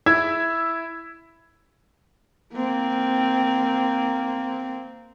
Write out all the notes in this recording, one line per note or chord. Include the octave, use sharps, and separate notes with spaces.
E4 E5 E6 G#6
A#3 C4